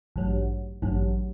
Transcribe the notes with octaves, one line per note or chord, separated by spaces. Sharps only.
A1 G2 F#3
A1 G2 F#3